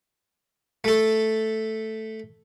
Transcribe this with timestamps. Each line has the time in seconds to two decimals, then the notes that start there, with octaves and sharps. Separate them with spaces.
0.84 A3 A4